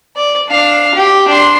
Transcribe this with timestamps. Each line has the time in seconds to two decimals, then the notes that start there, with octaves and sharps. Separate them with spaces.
0.16 D5
0.48 D4 F5
0.95 G4
1.28 D4 C6